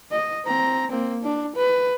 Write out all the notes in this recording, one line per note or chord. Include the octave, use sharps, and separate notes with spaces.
D#5
C4 A#5
A#3 C4
D4
B4